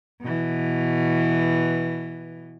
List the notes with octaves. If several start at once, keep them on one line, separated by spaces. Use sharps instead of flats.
B2 E3